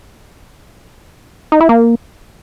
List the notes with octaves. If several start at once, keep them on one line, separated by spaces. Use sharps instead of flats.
D#4
E4
A#3